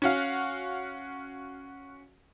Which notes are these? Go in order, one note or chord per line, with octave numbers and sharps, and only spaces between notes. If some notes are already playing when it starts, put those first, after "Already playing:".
C#4 F#4 F5